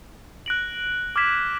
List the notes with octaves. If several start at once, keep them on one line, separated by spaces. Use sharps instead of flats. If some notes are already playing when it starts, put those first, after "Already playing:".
F#6 A#6 D7 F#7
D6 F6 G#6 B6 E7